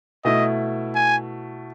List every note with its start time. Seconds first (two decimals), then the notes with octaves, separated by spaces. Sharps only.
0.24 B2 A3 E4 D#5
0.95 G#5